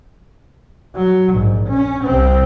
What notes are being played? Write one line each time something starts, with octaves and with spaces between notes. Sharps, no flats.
F#3
A#1 G#2
C#4
C2 C4